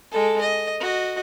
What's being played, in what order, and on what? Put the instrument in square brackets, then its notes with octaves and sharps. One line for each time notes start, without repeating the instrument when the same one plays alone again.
[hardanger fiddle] G#3 A4
D#5
F#4 D#5